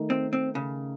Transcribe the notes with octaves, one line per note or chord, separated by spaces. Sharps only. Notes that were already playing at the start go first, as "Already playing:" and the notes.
Already playing: D#3 A3 D#4
C4
C4
C#3